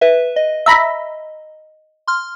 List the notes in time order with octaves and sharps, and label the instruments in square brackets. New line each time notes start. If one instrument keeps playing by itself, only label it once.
[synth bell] B4 E5
D#5
[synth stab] E5 A#5 B5
[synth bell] C6 F6